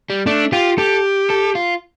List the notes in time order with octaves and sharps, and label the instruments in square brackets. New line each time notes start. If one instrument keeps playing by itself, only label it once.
[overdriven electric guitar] G3
[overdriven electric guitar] A3 [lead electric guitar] D4
[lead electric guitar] F4 [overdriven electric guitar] G4
[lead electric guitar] G4 [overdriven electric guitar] A4
[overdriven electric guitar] A4
F4